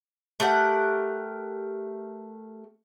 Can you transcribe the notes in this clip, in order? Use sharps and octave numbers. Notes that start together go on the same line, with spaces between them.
A3 G4 A#4 F#5